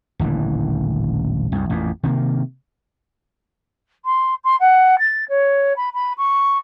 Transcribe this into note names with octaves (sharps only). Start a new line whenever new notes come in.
D#1 A1 D3 E3
C2 F#2
A1 F2 A#2
C3 D#3 A3 A#3
C6
C6
F#5
A6
C#5
B5
B5
C#6